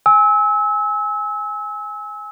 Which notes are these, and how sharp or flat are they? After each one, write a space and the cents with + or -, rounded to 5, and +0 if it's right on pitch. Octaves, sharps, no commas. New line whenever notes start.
G#5 +0 E6 -30